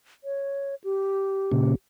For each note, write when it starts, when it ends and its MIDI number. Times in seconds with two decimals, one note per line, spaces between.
0.24 0.75 73
0.84 1.72 67
1.52 1.75 46
1.52 1.75 49